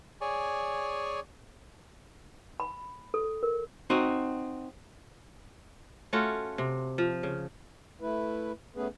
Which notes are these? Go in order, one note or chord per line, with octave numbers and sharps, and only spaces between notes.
G#4 C#5 D5 G#5
B5
A4
A#4
C4 D#4 F#4
A3 C#4 F4 F#4
C3
F3
C#3
A3 E4 B4
A3 B3 C#4 G#4 B4